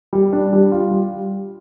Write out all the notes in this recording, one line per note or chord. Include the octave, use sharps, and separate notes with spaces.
G3
D4
G3
F4
G3